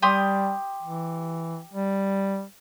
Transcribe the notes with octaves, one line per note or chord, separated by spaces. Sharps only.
G3 G4 C6 D#6
E3
G3